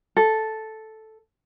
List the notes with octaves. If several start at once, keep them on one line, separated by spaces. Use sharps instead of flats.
A4